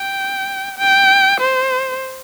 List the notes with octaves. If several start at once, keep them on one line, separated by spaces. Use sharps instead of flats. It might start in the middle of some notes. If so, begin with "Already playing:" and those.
Already playing: G5
G5
C5